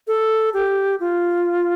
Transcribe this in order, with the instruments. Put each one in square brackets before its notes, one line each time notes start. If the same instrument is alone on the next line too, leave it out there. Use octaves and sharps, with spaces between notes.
[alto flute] A4
G4
F4